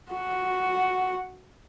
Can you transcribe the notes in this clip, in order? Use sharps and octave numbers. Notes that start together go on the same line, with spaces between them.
F#4 F#5